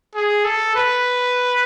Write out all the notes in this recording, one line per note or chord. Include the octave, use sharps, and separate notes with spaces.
G#4
A4
B4